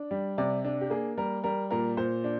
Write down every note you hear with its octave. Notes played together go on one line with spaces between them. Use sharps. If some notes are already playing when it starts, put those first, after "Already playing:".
Already playing: D4
G3
C3 D5
D4
G4
A#3 G#4
G3 A#4
G3 A#4
A#2 A#4
A#2 C5
D4